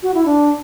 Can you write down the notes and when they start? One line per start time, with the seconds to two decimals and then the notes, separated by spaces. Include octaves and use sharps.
0.03 F#4
0.14 E4
0.26 D4